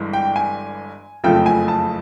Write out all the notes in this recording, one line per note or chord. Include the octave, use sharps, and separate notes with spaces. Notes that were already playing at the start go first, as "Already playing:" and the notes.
Already playing: G1 G2 E3 G#3
G5
G#5
F#1 F2 C#3 F3 A3 G5
G#5
A5